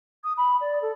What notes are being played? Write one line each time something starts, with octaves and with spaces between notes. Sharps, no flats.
D#6
B5
D5
A4